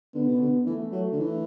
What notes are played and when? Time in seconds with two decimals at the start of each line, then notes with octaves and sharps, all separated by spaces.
0.14 D3 B3
0.27 B2
0.40 D3
0.66 E3 A3
0.92 F#3
1.12 D3
1.19 E3